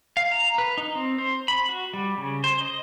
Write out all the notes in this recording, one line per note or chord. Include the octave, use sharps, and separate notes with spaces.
F5
A#5
B4
D#4
C4
C5
B5
F#4
G3
C#3
C5
D#5